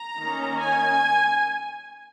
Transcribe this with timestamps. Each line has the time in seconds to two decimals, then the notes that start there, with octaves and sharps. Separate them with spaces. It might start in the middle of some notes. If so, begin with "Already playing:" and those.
Already playing: A#5
0.19 D#3 A#3 C#4
0.59 G#5